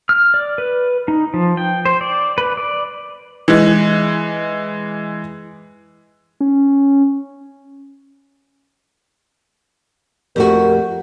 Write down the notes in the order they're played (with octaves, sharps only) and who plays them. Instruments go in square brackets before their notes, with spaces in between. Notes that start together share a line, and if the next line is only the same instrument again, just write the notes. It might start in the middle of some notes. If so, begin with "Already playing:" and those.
[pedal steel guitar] F6
D5
B4
D#4
F3
G5
C5
D5
B4
D5
[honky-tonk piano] E3 G#3
[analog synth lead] C#4
[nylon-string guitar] F2 A3 F#4 [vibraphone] G4 [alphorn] A#4